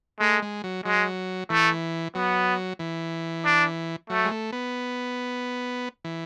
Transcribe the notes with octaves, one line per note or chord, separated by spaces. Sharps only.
G#3 A3
G#3
F#3
F#3 G#3
E3 A3
F#3 B3
E3
D4
F#3 A3
G#3
A3
B3
E3